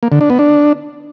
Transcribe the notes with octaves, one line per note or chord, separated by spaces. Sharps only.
A#3
D3
D4
B3
D4